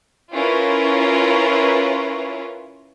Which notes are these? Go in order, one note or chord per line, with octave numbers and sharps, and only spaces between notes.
C#4 E4 F4 A#4 B4 C#5